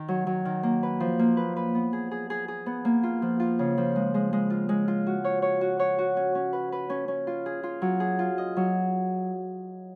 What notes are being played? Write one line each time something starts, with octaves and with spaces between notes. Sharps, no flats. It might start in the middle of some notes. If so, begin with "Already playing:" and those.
Already playing: D#3
F#3
F#3
D#3
A#3
B4
F3
A#3
B4
B4
B3
G#4
G#4
G#4
G#4
B3
A#3
F4
F3
F4
C#3
F3
G#3
G#3
G#3
F4
G#3
F4
F#4
C#5
C#5
F#4
C#5
F#4
C#4
C#4
B4
B4
C#4
C#4
F4
G#4
F4
F#3
G#4
F4
D#5
F#3